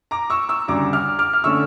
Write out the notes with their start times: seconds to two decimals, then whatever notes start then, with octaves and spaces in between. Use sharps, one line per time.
0.11 A#5 D6
0.30 C#6 E6
0.49 C#6 E6
0.68 D2 C#3 G3 A#5 D6
0.93 D6 F6
1.19 D6 F6
1.33 F6
1.44 D3 A3 C#4 C#6 E6